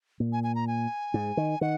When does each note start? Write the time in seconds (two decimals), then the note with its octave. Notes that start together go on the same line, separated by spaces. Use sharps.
0.20 A#2
0.33 G#5
0.44 G#5
0.55 A#5
0.67 G#5
1.14 G#2
1.37 D#3
1.61 D#3 F#5